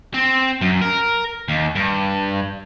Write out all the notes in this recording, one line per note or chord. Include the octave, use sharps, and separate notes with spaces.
C4
F#2
A#4
D#2
G2